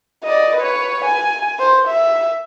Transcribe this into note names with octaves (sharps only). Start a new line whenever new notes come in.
D5 D#5
B4 C#5
G#5
C5
E5